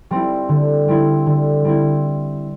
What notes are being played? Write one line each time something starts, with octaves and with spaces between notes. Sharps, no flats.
G3 C4 E4
D3
G3 C4 E4
D3
G3 C4 E4